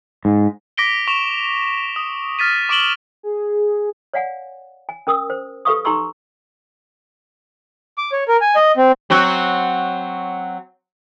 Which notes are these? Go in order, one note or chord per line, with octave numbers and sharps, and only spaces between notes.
G#2
D6 A#6 B6 D7 G7
C#6 E7 F7
D#6
F6 A6 B6 D#7
C#6 D6 D7 E7 F#7 G7
G#4
C#5 D5 F5 F#5 G#5
G#5
C#4 A#4 D#6 E6
C5
G4 A4 B4 F5 C#6 D#6
D#4 G4 A#5 C6 C#6 E6
D6
C#5
A#4
G#5
D#5
C4
F#3 C4 F#4